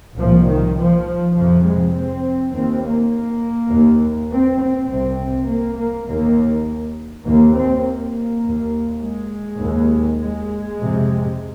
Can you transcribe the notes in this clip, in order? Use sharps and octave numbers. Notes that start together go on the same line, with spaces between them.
C2 A#2 F3
D#3
F3
F2 C3 F3
G#3
C4
D#2 C4
A#3
D#2
C4
C4
C2 C3 C4
A#3
A#3
D#2 A#3
D#2 A#3
C4
A#3
D#2
G#3
D#2
G#3
F2 C3